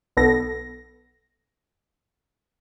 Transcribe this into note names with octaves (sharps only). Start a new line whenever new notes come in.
B1 B3 A4 A#6